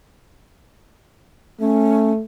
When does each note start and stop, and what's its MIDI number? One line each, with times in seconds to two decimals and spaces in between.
1.60 2.22 57
1.60 2.11 61